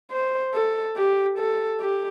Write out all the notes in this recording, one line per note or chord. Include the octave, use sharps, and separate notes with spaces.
C5
A4
G4
A4
G4